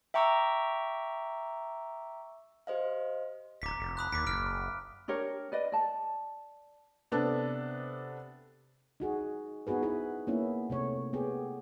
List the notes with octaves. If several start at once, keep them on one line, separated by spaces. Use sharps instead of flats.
E5 G5 A#5 C#6 D6 E6
G4 C5 D#5 F5
D1 A#5 D6 B6
F1
B5 D#6 F#6
D#2 D6 B6
F#1 F6 D7
D4 G4 A#4 C#5
B4 D5 D#5
D5 A5
C3 B3 D4 A4 A5
D#4 F#4 G#4
B3 D#4 F#4 G#4 B4
E4 G#4 B4
A#3 B3 C#4 E4
C3 A3 C#5
B3 G4 G#4